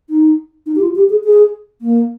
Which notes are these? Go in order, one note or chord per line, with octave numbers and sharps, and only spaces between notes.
D#4
D#4
G4
F4
G4
G#4
G#4
A#3